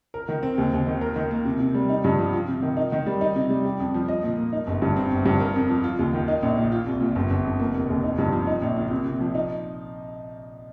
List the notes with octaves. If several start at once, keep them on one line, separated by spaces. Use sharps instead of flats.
A#4
D#3
C4
D#2
D#2
D#3
A#4
D#3
A#3
C3
C3
G3
D#4
G2
F3
F4
C3
D#3
D#4
D#3
G3
D#4
C3
G3
G4
F2
F3
D#5
A#2
A#3
D#4
G1
G2
C4
G1
G2
A#4
F2
F3
F4
D#2
D#3
D#4
A#1
A#2
F4
C2
A#2
G1
G1
F2
A#3
F1
D#2
D#4
G2
F3
D#4
A#1
A#2
C3
C3
F3
D#4